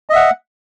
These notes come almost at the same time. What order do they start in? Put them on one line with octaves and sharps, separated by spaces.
D#5 E5 F#5